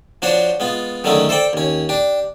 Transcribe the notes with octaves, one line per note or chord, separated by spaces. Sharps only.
F3 D4 F#4 C5 C#5
G#3 B3 F4
D3 D#3 F#3 G#3 A3 C#4
A4 C5 D5 G5
D#2 C#4
D4 G4